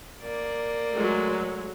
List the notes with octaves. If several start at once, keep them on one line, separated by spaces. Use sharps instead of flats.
A#3 D5
F#3 G#3 A3